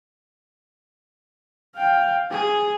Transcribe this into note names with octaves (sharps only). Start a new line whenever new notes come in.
F5 G5
G#4